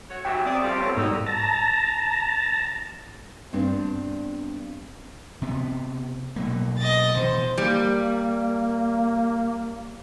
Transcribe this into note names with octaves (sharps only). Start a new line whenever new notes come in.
A3 F#4 C#5
G#2 B2 F#3 G4 E5 G5
C4 D5 E5 D#6
C3 G3 F4 A4
B3 A4 C#5
D#2 G#2 G3 D#4 F#4 E6
A5 A#5
G2 B3 C4 D4
C3 B3
B2 F#3 A#3
D#5 A6
B2 E3 C5
G3 A#3